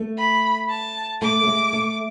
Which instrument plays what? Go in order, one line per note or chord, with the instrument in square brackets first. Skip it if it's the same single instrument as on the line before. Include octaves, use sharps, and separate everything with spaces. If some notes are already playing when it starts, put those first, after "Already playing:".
Already playing: [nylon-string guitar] A3
[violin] B5
A5
[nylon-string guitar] A3 [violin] D6
[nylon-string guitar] A3
G#3
A3